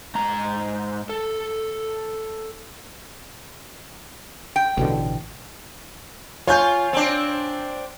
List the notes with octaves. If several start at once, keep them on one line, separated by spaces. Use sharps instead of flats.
G#2 A#5
A4
G5
A1 B2 D3
F4 C#5 G#5 G6
C4 D4